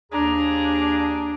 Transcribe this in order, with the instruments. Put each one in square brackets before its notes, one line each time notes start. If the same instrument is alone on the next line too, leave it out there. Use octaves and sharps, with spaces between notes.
[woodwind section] D#2 A#5 [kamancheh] D4 [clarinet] G#4